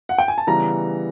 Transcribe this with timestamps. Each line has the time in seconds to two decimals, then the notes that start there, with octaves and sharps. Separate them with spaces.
0.09 F#5
0.18 G5
0.28 G#5
0.38 A5
0.47 C#3 E3 G3 B3 A#5